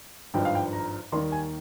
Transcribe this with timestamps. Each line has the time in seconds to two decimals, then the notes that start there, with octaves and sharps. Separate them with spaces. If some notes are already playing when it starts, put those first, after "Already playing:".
0.34 G#1 G2 F3 G5
0.45 F5
0.55 G5
0.73 A#5
1.12 D#2 D#3 G3 A#3 C6
1.32 G#5